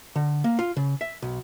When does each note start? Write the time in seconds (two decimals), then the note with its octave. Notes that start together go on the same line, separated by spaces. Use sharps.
0.16 D3
0.44 A#3
0.59 F4
0.77 C#3
1.01 E5
1.22 B1